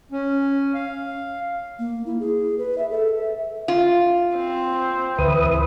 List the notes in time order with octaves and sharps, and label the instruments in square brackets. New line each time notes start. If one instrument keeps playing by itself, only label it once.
[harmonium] C#4
F5
[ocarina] A#3
E4
G#4
B4
E5
A4
E5
[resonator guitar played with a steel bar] F4
[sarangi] C4
[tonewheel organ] D2 B4 D#6 [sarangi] E3